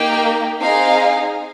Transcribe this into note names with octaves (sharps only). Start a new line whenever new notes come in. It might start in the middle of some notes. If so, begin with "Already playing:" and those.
Already playing: A#3 D#4 G4 G5
C4 D#4 G#4 F5